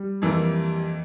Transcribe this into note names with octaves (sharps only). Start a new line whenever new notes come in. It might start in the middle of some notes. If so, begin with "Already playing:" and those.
Already playing: G3
F2 E3 A#3